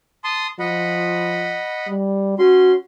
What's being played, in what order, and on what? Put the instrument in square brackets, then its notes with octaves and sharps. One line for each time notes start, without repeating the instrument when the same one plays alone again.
[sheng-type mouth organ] A5 C6 D#6
[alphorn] F3 [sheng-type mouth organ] D#5 F#5 B5
[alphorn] G3
[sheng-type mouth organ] C#4 C6 [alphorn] F#4